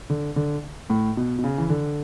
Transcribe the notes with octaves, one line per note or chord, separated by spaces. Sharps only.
D3
D3
A2
B2
B2
C#3
E3
D3